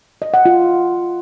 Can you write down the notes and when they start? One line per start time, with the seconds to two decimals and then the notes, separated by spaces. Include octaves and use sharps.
0.22 D#5
0.34 F#5
0.46 F4